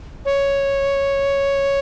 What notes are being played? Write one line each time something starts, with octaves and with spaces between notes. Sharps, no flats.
C#5